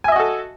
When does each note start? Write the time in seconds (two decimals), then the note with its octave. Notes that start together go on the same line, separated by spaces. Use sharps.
0.04 G#5
0.08 E5
0.12 D#5
0.16 F#4
0.20 A4